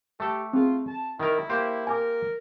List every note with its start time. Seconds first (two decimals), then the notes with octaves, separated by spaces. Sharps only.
0.20 A3 G4 A4
0.53 C4 F4 G#4
0.86 A5
1.20 D#3 E4 A#4
1.49 A#3 G4 C5
1.87 A#4 G#5 D6